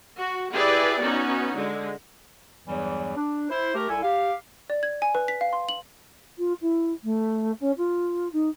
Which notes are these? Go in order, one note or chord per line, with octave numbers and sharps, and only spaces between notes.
F#4
E4 G4 G#4 B4 D5
B3 C#4 D#4 F#4
D3 G#3
E2 G2 E3 F#3 G3
D4
E4 C5
A3 G4 A#4
C2 E4 A4 G#5
G4 F5
D5
G#6
G#5
B4
B6
F5
C6
F#7
F4
E4
A3
C#4
F4
D#4